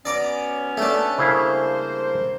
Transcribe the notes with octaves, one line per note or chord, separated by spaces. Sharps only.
F#3 B3 C#4 D5 A#5 D6
A3 D4
C#3 G3 A#3 E4 C5 F5